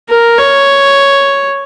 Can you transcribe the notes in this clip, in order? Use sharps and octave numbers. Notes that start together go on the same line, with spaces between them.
A#4
C#5